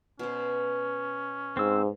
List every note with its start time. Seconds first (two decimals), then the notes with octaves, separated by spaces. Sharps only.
0.19 B2 C#4 C5
1.57 G#2 C4 E6